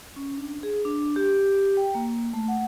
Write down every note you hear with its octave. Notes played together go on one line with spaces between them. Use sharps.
C#4
D4
G#4
D4
G4
G5
A#3
A3
F#5